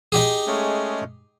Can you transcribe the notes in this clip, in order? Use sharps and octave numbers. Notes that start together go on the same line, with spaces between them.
D#4 G4 G#4
G#3 A3 C#4